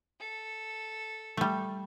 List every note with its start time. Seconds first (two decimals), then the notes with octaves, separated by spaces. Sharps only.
0.20 A4
1.37 G3 A3